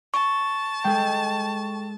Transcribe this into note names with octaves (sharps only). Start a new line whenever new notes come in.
A5 C#6
G#3 A4 G5